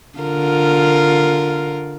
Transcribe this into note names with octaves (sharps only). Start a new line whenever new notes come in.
D3 F4 A#4